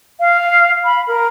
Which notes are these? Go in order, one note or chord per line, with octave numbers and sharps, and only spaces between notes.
F5
B5
A#4